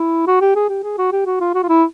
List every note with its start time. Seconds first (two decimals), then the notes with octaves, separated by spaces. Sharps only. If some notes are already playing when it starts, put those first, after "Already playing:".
Already playing: E4
0.27 F#4
0.41 G4
0.55 G#4
0.69 G4
0.83 G#4
0.98 F#4
1.12 G4
1.26 F#4
1.40 F4
1.54 F#4
1.63 F4
1.69 E4